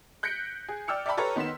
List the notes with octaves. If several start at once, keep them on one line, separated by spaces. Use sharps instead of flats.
F#6 G6 A#6 B6 C#7 D7
G#4
D5 G5 E6 F6 C#7
D5 E5 G5 A5 B5
G4 A4 B4 C#5 A#5
D#3 B3 C6 B6 E7